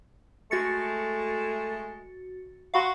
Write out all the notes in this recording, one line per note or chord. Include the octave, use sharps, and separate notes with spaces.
G#3 A3 F#4 A6 C#7
F#4 F5 B5 C6